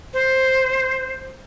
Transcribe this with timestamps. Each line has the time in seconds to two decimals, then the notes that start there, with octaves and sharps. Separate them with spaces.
0.14 C5